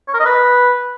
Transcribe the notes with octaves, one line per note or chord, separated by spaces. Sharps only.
C#5
A#4
D#5
B4